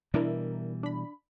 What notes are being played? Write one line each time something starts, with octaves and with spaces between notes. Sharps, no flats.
B2 E3 G3 D4 E4 A#4
D4 B5